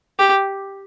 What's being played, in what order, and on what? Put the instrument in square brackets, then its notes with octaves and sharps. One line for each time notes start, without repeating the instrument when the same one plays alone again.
[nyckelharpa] G4